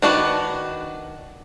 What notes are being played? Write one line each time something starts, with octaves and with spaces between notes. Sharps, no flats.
D#3 D4 F#4 B4